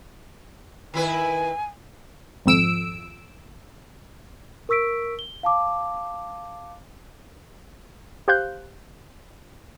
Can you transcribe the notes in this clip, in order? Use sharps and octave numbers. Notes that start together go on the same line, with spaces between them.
D#3 E4 B4 G#5
G#1 F2 E6 D7
A#4 C#6 E6 B6 D7
G7
F5 A5 D6
G4 C5 F5 F#6 G6